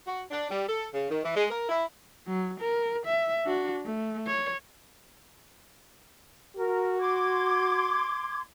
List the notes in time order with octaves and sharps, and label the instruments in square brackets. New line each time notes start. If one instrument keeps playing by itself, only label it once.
[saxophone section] F#4
D4
G3
A4
C#3
D#3
E3
G#3
A#4
E4
[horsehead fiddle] F#3
A#4
E5
D4 F#4
A3
C#5
[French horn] F#4 [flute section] A#4
[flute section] C6 D6 G#6